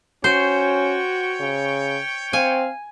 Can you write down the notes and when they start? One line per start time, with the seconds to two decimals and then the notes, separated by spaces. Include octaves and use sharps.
0.24 C#4 F#4 C5 C#5 G5 C#6
1.40 C#3
2.33 C4 F5 G#5